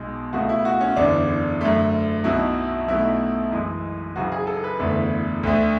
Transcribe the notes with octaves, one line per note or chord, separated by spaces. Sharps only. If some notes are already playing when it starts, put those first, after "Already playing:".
Already playing: B1 B2 G#3
C#2 B2 A3 F#4
E4
F#4
C#4
F#1 E2 D3 D4
F#2 D3 A3
B1 B2 F#3 E4
B1 B2 F#3 A3 E4
F#2 E3 G#3
F#1 F#2 C#3 F#4
G#4
A4
B4
F#1 E2 D3 A3
D2 D3 A3